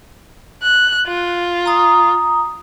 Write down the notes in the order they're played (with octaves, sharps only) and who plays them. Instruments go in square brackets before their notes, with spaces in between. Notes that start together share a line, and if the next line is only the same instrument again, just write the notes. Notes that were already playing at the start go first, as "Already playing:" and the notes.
[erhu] F#6
F4
[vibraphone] A#5 D#6